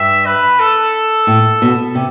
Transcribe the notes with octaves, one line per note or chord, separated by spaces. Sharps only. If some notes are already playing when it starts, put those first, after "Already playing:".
Already playing: G2 E5
B4
A4
A2
B2
C3